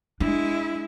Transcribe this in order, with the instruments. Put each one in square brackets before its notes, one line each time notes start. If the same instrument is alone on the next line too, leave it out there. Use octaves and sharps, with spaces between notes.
[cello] G#3 E4 [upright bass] D4